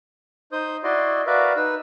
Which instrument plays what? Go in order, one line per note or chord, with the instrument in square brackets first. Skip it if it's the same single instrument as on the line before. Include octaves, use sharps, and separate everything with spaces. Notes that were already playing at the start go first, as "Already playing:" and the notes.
[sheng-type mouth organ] D#4 C5 D#6 G6
E4 F#4 D5 D#5 C6
F#4 A#4 B4 D5 E5 F5
D#4 B4 E6